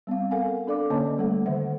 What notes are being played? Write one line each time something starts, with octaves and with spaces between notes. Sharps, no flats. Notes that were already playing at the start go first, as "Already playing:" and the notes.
G3 B3 C4 F5
A4 A#4 F5 F#5 G#5
D4 A4 D5 F5 D6
D3 A#3 C#4 C#5 D#5 A5
G3 A3 A4 F#5
D3 D#3 C5 E5 F#5